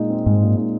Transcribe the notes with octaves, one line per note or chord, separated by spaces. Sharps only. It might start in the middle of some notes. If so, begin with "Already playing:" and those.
Already playing: A#2 G#3 D#4
C4
G#2 G#3
A#2
D#4